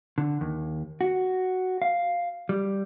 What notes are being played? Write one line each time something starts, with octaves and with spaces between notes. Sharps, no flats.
D3
D#2
F#4
F5
G3